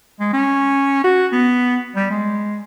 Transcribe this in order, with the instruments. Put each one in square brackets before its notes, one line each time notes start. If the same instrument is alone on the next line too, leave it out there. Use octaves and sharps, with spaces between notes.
[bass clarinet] G#3
C#4
F#4
B3
G3
G#3